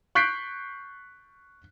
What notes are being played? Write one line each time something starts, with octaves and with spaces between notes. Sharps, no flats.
C#6 F#6 G6 B6 C7 D7